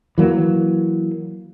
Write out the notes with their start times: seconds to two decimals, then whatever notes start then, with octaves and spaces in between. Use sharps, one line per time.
0.18 E3 F#3 A#3